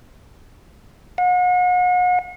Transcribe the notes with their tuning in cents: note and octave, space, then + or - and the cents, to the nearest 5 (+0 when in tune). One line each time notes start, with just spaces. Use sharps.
F#5 -40